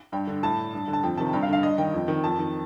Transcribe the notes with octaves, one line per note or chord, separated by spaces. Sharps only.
G2 G5
D3
A2 A5
G2
D3
A5
F2 G5
C3 D#3 A5
G2 G5
F5
D3
F5
G2 D#5
D#3 G5
F2
D#3
F2 A5
D#3